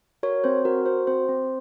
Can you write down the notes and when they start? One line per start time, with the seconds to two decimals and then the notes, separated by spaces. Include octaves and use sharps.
0.23 F#4 A#4 C#5
0.44 C4 C5
0.65 F#4 A#4
0.86 F#4 C5
1.07 C4 C5
1.29 C4